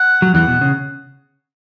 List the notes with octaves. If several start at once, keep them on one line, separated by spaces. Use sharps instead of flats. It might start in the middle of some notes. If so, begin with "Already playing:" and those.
Already playing: F#5
F#3
E2 E3 F#5
B2
C#3